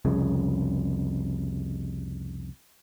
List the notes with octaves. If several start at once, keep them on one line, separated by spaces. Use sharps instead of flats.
C2 F2 C#3